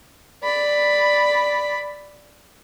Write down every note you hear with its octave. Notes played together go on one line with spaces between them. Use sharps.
D5 B5